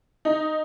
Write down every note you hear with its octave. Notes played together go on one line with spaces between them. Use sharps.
D#4